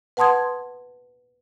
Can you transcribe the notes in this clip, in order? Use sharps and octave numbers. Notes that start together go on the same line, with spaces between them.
B4 F#5 A5 C6 D#6 G#6